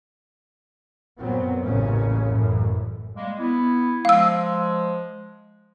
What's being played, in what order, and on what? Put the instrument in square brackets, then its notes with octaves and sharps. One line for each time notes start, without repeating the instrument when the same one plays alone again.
[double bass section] F#2 A#2 F#3 B3 C4
A1 D#2 A#2 C#3 E3 C#4
A1 F#2 A2 E3
[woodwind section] G3 G#3 A#3
B3 E4
[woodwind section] F3 G#3 [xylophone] F5 E6